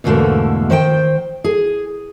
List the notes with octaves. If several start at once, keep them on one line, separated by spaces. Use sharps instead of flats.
E2 G#2 B2 D3 A3 A#3
D#3 C5 D#5 G5
G#4